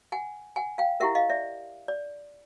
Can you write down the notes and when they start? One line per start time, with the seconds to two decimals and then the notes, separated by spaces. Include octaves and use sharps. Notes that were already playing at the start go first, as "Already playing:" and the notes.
0.12 F#5 G#5
0.56 F#5 G#5
0.78 F5 G5
1.00 E4 G4 A#4 E5 F#5
1.15 D#5 F5
1.29 D5 E5
1.88 D5